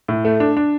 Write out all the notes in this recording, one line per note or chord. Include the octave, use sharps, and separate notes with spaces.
A2
A3
D4
D4